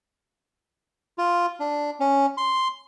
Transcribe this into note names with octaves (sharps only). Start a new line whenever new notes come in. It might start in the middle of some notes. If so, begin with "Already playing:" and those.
F4
D4
C#4
C6